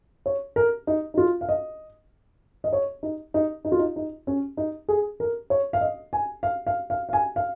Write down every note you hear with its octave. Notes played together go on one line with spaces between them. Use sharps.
C#5
A#4
D#4
D#4
F4
F5
D#5
D#5
C#5
D#4
D#4
D#4
F4
D#4
D#4
C#4
D#4
G#4
A#4
C#5
F5
D#5
G#5
F5
F5
F5
F5
G#5
F5